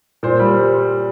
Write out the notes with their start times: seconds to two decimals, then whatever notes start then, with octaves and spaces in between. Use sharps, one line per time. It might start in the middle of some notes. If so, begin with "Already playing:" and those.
0.23 A#2 C5
0.39 G3